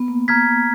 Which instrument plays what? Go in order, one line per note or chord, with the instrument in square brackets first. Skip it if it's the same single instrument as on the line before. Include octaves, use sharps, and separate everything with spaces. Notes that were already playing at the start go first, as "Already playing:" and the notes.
Already playing: [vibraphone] B3
A#3
[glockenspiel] A#5 F6 G#6 B6